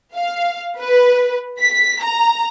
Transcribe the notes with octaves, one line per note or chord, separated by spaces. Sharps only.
F5
B4
B6
A#5